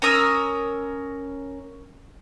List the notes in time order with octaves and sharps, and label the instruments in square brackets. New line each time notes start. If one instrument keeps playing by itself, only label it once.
[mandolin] C#4 A#4 D#6 E6